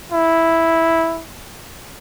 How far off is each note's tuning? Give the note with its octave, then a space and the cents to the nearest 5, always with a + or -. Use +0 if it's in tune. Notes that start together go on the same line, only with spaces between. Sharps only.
E4 -5